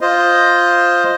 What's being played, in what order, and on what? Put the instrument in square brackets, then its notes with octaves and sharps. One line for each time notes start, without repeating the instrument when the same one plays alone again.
[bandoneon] F4 C5 D#5